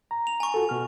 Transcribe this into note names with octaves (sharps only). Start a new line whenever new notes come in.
A#5
F7
G#5 C#6
F4 F#4 A4
B2 F#4 F6